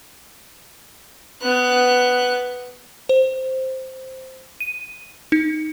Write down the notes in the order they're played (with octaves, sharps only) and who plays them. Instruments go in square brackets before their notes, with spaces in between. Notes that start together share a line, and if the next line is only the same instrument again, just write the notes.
[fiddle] B3 F#6
[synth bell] C5
D#7
D#4